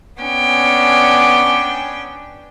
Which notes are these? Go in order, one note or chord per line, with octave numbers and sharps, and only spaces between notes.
B3 C#4 D4 G5 G#5